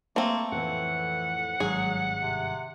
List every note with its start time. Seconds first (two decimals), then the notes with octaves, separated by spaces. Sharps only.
0.16 A3 A#3 C4 A4
0.52 F2 A2 E3 F#5
1.60 G#1 G2 F#3 G#4
2.22 C3